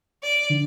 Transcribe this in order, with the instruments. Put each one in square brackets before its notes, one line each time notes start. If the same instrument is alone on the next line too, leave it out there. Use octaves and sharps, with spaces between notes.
[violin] D5
[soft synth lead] D3